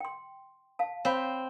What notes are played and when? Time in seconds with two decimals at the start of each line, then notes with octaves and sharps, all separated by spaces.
0.01 G5 C6
0.79 F5 A5
1.05 C4 C#5 F5 B5